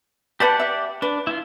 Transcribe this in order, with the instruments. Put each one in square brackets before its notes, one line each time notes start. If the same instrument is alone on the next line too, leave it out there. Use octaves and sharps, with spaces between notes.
[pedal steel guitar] G4 D5 F#5 [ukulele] B4 E5 A5
[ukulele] E5
[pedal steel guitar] D4 [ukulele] B4
[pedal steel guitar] E4 F4